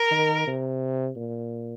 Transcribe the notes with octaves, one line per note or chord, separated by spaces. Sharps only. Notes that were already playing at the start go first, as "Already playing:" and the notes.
Already playing: A#4
D#3
C3
A#2